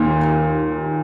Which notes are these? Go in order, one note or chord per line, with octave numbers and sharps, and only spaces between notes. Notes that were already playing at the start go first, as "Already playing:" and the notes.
Already playing: D#2 A#2 D#3